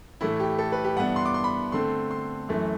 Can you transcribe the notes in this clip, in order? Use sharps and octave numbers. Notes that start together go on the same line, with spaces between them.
A2 E3 A3 E4
G4
A4
B4
G4
G2 E3 B3 D4 F#5
C6
D6
C6
B5
D3 A3 C4 C6
C6
F#2 E3 A3